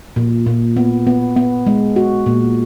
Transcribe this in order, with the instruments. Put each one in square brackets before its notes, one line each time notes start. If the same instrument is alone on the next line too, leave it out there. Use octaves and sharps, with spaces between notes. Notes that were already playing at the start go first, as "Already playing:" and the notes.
[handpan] A#2
A#2
B3
B3
B3
G#3
F#4
A#2